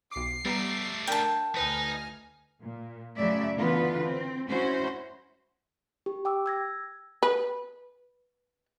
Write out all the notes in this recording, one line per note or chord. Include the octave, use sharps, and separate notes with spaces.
B1 D6 C7
G3 A3 B3 G4 A#5
D4 A#4 G5 A5
D2 D#4 B4 G#5 D#6 F6 B6
A#2
F#2 C#3 F#3 A3 D5 E5
D3 E3 B3 F4 B4
C4
C#4 E4 F#4 C5
G4
G5 D6 E6
E6 G#6 A#6
B4